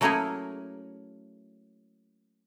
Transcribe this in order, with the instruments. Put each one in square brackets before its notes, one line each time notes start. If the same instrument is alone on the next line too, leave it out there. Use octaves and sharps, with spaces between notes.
[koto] F#3 A3 A#3 C#4 E4 G#4